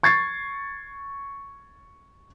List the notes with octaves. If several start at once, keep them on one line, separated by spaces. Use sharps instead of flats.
C#6 G#6 A6 C7